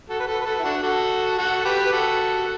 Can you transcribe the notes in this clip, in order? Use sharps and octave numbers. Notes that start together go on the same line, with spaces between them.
F#4 A4
B4
F#4 A4
B4
F#4 A4
E4
D4 F#4
F#4 A4
F#4 A4
G4 B4
B4
F#4 A4